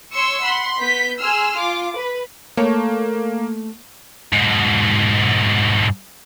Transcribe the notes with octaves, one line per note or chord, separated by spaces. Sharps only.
C#5 C6 C#6 E6
F#5 B5 C6
B3 G6 B6
G#4 G#5 C6 E6 F6
F4 D6
B4
A3 A#3 C#5
G#2 B2